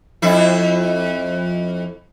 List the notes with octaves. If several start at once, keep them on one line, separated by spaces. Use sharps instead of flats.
F2 E4